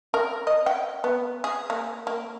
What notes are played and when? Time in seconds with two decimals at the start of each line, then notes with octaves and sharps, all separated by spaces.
0.14 A#4
0.47 D#5
0.66 G5
1.04 B3
1.44 G#4
1.70 A#3
2.07 A#3